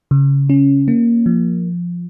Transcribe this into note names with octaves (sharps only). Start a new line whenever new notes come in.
C#3
C#4
A#3
F3